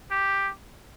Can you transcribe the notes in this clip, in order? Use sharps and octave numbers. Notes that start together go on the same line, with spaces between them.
G4